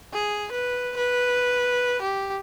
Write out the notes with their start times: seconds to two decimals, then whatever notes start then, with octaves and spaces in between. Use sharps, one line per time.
0.13 G#4
0.52 B4
0.97 B4
2.02 G4